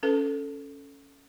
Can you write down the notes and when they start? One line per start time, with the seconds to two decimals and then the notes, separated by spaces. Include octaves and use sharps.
0.03 C#4 A4 B4